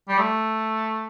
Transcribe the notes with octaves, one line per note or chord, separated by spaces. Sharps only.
G3
A3